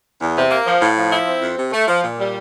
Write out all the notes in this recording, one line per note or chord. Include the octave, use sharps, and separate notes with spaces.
E2
C3
A#3
F3
A2
F3
E4
C4
F2
C3
A3
F3
A#2
G3